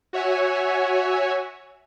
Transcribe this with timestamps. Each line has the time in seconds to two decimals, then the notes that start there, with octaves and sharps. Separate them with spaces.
0.13 F#4 C#5 E5 F#5 G#5